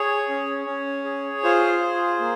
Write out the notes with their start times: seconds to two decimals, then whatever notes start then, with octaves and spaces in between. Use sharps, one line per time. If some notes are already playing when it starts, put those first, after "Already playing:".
Already playing: G#4 C#5
0.29 C#4
0.66 C#4
1.05 G#4
1.44 F4 C5
1.81 G#4
2.20 A#3